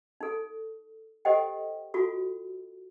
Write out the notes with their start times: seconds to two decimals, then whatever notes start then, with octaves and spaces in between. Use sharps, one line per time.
0.21 D#4 A4
1.25 G4 A4 C5 D#5 F#5 G5
1.94 F4 F#4 A4